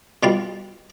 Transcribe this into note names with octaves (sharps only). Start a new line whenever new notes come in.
B2 G3 F4 F5